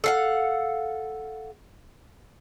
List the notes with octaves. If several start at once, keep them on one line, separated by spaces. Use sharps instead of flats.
A4 F5 F#5